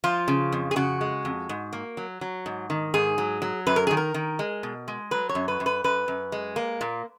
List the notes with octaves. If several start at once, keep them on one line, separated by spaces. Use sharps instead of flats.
F3 F4
C#3
F2
G#4
C#3 F#4
G#3
F2
G#2
A#3
F#3
F#3
G#2
D#3
G#2 G#4
F#3
F#3
F#2 B4
A#4
D#3 G#4
A#4
D#3
G#3
B2
G#3
F#3 B4
C#5
F#2
B4
F#2
B4
F#2 B4
F#2
G#3
A#3
A#2